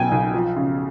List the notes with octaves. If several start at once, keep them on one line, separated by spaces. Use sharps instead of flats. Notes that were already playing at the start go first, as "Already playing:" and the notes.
Already playing: B1 B2 F#3 G5 G#5
B1
F3
C#3